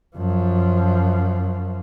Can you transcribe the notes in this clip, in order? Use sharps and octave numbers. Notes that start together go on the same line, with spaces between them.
F#2 F3